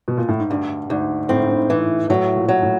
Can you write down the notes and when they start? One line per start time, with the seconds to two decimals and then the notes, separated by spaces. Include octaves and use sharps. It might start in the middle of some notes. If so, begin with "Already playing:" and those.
0.08 B2
0.17 A#2
0.28 A2
0.40 G#2
0.50 D2 G2
0.89 D2 G#2
1.29 A2 C4
1.38 G#2
1.47 G2
1.56 G#2
1.70 E3
2.10 A2 F#3
2.36 A#2
2.48 F#3
2.62 A2